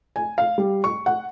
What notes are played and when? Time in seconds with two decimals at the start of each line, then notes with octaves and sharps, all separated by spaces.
0.16 G#5
0.38 F5
0.58 G3
0.84 C#6
1.06 F#5